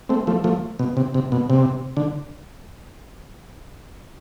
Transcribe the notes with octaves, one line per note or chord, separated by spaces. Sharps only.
A3 C4
F3 A3
F3 A3
B2
C3
C3
B2
C3
D3